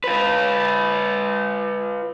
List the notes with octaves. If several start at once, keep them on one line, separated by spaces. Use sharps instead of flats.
F4 B4